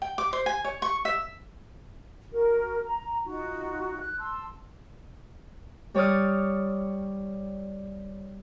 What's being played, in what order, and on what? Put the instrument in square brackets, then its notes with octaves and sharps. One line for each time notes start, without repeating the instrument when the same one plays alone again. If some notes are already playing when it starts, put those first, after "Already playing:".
[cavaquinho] G5
D6
C5
G#5
C#5
C#6
E5
[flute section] F#4 A#4
A#5
D#4 F4 F#4
F#6
A5 C6 E6
[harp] G3 C#5 D5 D#6 F6